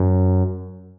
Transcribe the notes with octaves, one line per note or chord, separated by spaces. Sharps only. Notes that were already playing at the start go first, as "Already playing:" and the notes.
Already playing: F#2